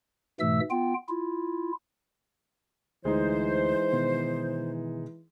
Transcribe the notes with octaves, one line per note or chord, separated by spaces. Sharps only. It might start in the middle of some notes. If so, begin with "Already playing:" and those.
G#2 B2 E3 A3 E5 E6
B3 F4 G5
E4 F4
D2 E3 G#3 D#4 C5
B2 D#3 B3